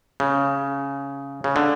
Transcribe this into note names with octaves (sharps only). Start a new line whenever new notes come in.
C#3
C#3
D3